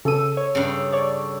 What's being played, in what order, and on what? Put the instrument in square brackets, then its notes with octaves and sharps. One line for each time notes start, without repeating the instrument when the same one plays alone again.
[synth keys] C#3 D#7 [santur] A4 E6
[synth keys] C#5
[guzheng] G2 C#3
[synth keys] C#5 D5